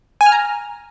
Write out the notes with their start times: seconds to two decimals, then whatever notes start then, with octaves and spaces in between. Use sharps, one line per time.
0.21 G#5
0.26 F6
0.32 A#5